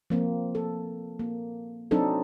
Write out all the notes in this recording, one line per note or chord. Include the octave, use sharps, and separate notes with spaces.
F3 A#3 C4
A4
A#3
F#3 C4 D4 D#4 A4